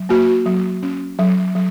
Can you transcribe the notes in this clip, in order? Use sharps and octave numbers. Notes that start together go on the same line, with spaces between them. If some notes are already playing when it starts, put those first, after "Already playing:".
Already playing: F#3
A#3 F#4
F#3
C#4
F#3
F#3